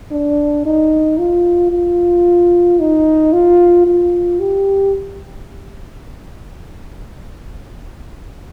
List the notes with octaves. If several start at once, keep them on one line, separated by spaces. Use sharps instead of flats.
D4
D#4
F4
F4
D#4
F4
F4
G4